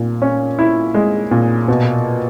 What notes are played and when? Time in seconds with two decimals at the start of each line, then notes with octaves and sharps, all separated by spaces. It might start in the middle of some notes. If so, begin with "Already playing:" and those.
Already playing: A#2
0.22 C#4
0.59 E4
0.94 G#3
1.31 A#2
1.68 B2